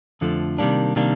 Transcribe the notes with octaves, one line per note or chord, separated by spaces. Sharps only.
F2 D3 F3 A3
C3 D#3 G3 A#3 D4
C3 D#3 G3 A#3 D4